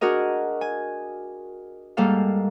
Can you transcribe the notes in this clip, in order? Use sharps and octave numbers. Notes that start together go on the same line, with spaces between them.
D4 F#4 G#4 A#4 D#5
G#5
G#2 G3 A#3 A4 F5